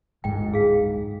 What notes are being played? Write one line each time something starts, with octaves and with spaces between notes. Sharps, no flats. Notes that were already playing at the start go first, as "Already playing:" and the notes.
D1 G1 G#2 G5
G#4 F5